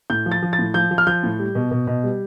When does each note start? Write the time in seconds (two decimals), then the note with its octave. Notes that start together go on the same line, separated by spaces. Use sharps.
0.10 A2 G6
0.26 F3
0.31 A6
0.43 F3
0.53 A6
0.59 A2
0.74 F3 G6
0.91 F3
0.98 F6
1.07 F3 G6
1.23 A2
1.39 G3
1.55 B2
1.71 B2
1.87 B2
2.04 G3